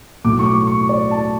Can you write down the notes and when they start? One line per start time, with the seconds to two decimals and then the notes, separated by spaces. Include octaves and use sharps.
0.24 B1 A2 F#3 A3 D6
0.39 C#6
0.46 D6
0.67 C#6
0.89 D5
1.11 A5